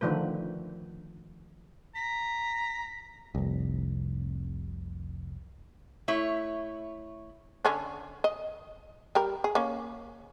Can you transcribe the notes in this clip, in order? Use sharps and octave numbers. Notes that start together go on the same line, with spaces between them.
D3 D#3 F3 A3 B4
A#5 B6
F1 C2
A3 E4 C#5
D3 C#4 D4
D#5
G3 A#4
G#4
A#3 C#4